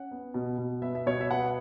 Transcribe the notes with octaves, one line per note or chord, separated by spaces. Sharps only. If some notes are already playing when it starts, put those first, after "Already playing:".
Already playing: C#4 F#5
B3
B2
B2
B3 E5
E5
B2 C#5
E5
B3 F#5